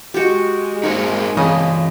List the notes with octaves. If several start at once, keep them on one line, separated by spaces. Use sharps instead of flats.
G#3 F#4 G4
A#3 D#4 A#4 C5 F#5
C#3 E3 C4 D#5